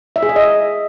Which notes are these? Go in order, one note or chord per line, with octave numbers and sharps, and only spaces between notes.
E5
G#4
E5
D#5